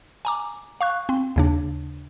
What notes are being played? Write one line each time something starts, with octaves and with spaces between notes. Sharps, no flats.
G#5 A#5 D6
F5 C#6 F#6
C4
D#2 C#3 D4